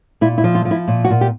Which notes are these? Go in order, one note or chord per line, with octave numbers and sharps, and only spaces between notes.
A#2 E4
E4
F3
F4
F3
E4
A#2
F#4
A#2
G4